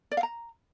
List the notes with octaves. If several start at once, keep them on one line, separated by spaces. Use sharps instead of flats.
D5
F5
A#5